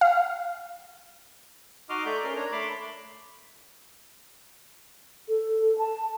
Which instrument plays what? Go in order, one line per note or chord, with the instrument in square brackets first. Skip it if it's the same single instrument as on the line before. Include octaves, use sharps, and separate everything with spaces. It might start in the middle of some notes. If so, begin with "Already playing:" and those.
[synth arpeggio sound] F5
[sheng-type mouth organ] D#4 F#4 D#5 C6 D6 F6
A3 A4 D5 E5 A#5 G6
C#4 A#4 C6
D4 C#5 A#5
A3 A5 B5 C6 D6
[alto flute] A4
A5